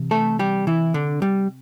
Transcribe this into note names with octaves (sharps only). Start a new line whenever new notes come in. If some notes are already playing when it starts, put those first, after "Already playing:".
Already playing: C3 E3
A3 A4
G3 G4
E3 E4
D3 D4
G3